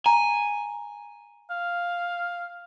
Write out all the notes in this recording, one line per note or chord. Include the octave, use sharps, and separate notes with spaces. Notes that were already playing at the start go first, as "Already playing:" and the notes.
G#5 A#5
F5